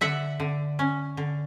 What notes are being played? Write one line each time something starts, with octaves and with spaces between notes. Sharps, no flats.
D3 E5 F#5
D3
C#4
D3